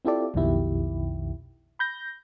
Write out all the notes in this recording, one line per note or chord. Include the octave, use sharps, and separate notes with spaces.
C4 E4 F4 G4 A4 D5
B1 F2 B2 D#3 E4 G4
B5 G6 A#6